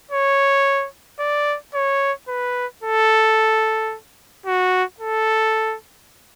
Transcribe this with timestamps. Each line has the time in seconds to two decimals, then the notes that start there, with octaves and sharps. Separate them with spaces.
0.11 C#5
1.19 D5
1.74 C#5
2.28 B4
2.83 A4
4.46 F#4
5.00 A4